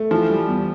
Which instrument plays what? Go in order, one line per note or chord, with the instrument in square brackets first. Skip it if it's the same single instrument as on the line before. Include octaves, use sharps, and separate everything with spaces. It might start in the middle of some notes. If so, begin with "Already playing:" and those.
Already playing: [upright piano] A3
[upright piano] E3 [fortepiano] F3
[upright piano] G3
E2